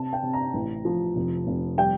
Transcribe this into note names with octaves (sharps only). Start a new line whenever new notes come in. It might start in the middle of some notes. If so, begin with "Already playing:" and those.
Already playing: C3 A5
G5
C3
A#5
A1
F3
F1
F1
G3 G5